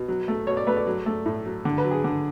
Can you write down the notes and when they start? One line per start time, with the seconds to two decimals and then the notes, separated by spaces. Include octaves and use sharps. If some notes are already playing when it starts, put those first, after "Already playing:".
Already playing: B2
0.08 F#3
0.28 A3
0.47 B2 C#5
0.57 D5
0.67 A3 B4
0.77 D5
0.87 F#3
1.06 A3
1.26 A2
1.45 F#3
1.65 D3
1.78 B4
1.84 F#3
1.91 G#4
2.04 D3